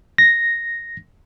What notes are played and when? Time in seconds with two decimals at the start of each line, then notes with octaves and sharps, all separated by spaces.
0.18 A#6